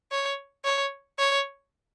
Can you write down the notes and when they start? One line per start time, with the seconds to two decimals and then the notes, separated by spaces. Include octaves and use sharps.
0.12 C#5
0.64 C#5
1.18 C#5